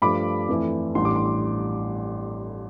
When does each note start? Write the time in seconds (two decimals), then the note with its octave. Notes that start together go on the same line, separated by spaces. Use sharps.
0.02 G2 F3 A3 D4 B5 D6
0.48 F2 E3 A3 E4
0.95 A1 A2 G3 B3 D4 C6
1.05 D6
1.16 C6
1.26 D6